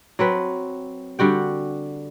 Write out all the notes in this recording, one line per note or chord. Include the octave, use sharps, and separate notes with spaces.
F#3 C4 B4
D3 G3 F#4 G5